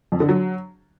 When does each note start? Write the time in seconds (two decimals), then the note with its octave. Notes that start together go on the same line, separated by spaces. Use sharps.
0.12 F2
0.20 D3
0.29 F#3